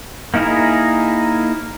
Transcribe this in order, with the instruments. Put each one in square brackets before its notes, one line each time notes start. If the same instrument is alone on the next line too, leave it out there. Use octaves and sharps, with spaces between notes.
[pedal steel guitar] A#3 D#4 E4 G#4 A#4